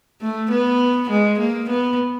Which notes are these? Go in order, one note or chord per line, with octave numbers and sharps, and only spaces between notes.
A3
B3
G#3
A#3
B3